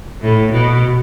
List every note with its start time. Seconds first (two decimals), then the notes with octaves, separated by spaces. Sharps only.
0.22 A2
0.52 B2